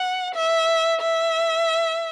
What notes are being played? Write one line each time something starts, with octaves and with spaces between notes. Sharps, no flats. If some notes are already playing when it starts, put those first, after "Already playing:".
Already playing: F#5
E5
E5